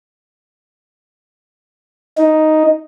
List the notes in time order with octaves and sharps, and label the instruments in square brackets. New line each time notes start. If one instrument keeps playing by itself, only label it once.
[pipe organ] D#4